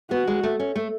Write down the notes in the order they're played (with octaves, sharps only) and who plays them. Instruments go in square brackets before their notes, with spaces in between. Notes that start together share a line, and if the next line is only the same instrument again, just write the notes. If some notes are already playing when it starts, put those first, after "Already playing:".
[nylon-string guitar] B3 [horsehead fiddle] F#4
[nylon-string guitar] G#3
A3
C#4
A3